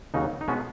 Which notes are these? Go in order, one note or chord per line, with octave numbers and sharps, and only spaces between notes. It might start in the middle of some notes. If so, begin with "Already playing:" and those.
D#2 C#3 F#3 D#4
D#4
B2 G#3 B3 C#4 F#4